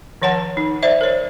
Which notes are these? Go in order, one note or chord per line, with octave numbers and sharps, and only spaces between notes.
D#3 F3 C#5 F#5 A5
D#4
C5 D5 E5
A#4 C#5